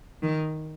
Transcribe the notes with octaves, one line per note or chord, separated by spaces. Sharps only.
D#3